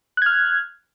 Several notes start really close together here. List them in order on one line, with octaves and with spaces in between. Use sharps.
F#6 G#6 F6